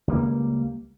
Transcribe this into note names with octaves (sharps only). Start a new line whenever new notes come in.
C#2 G3 A#3